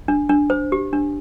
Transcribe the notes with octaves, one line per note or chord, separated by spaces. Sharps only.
D4
D4
C5
G4
D4